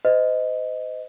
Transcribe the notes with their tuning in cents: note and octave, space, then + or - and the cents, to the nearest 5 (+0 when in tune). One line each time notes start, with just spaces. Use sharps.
C5 -40 D#5 +0